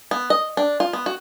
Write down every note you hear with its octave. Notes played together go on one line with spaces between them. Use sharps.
B3
D#5
D4
F4
B3
F#4